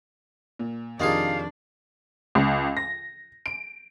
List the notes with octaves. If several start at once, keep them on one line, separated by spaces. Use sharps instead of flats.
A#2
F2 C3 D#3 D4 D#4 F4 G#4 F5
C#2
A#6
D7